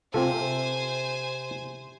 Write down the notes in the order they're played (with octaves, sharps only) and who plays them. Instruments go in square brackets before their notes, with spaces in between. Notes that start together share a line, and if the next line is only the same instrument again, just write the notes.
[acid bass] C3 [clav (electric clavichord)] C4 F4 A4 [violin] C5 G#5